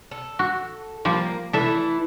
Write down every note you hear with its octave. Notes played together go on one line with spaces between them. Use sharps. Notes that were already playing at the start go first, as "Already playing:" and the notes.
A4
F#4
F3 G3 A#3
E3 A3 E4 A4 E5